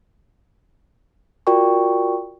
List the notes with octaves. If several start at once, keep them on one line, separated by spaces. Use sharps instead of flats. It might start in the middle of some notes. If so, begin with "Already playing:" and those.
F4 F#4 A#4 D5 G5 C#6